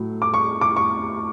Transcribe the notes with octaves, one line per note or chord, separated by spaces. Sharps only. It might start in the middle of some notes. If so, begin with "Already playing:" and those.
Already playing: A2 F#3
D6
C#6
D6
C#6